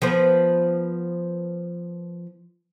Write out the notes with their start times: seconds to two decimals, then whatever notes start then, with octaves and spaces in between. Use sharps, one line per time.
0.02 F3 B3 C5